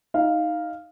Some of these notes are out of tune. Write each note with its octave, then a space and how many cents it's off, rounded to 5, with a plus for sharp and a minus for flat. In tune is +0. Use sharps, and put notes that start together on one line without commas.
D#4 +10 F5 +0